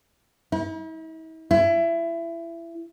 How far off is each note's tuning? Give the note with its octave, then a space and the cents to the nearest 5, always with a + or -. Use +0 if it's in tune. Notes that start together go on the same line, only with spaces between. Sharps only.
E4 -45
E4 +25